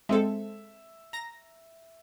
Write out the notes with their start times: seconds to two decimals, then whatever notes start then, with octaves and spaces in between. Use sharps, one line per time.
0.09 G#3 C4 A4 E5
1.13 A#5 A#6